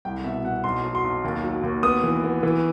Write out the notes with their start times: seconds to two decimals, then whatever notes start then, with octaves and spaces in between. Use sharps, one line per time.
0.05 C2 G5
0.24 B2 E5
0.44 B2 F#5
0.64 B1 C6
0.84 F#3
0.95 C6
1.04 B1
1.24 D#2
1.44 F#3
1.63 D#2
1.83 B3 D#6
2.03 E3
2.24 B3
2.43 E3